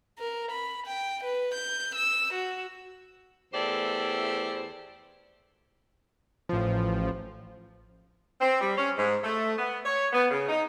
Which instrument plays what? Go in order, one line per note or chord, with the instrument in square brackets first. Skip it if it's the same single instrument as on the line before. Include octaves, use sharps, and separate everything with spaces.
[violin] A#4
B5
G5
B4
G6
E6
F#4
[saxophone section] E2 A3 E4 G4 C5 D5
[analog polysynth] A1 F3
[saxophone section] C4
G3
C#4
G#2
A3
B3
C#5
B3
C#3
D#4